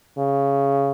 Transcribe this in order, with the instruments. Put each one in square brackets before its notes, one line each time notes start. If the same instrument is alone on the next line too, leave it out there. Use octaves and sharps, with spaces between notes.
[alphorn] C#3